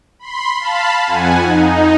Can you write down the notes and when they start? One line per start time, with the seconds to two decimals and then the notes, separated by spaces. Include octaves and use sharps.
0.19 B5 C6
0.60 F5 A5 B5
1.05 F2 F#5 G#5
1.41 D#4